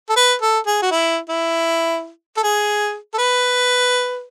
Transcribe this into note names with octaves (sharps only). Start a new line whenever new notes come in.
A4
B4
A4
G#4
F#4
E4
E4
A4
G#4
A4
B4